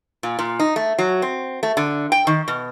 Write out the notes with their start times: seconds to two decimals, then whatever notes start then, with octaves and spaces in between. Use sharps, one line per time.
0.23 A#2
0.39 A#2
0.60 D#4
0.76 A3
0.99 F#3
1.22 C4
1.63 A3
1.77 D3
2.12 G5
2.27 D#3
2.48 B2